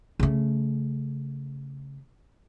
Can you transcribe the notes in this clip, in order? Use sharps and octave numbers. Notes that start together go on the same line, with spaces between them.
C#3 A3